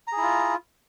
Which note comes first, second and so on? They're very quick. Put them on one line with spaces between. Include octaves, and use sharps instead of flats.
A#5 G#4 E4 F4